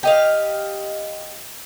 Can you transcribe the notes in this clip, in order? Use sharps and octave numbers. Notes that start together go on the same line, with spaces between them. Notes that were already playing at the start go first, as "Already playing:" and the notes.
G4 D#5 F5